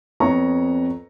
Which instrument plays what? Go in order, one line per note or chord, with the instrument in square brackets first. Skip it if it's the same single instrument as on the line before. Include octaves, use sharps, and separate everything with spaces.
[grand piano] F2 B3 C#5 A#5 C#6